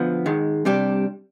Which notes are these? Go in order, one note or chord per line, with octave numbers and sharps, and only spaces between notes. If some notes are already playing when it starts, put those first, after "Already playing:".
Already playing: D2 D3 F3 B3
G#2 D#3 G#3
C3 G3 D4 G4